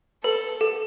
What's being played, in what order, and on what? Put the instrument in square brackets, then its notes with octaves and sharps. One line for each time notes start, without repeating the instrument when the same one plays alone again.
[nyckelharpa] A4 [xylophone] B4
[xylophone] A4